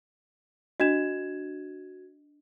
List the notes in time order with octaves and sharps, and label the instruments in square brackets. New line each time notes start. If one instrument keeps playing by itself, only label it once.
[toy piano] D4 D#5 [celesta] F#4 G#6 E7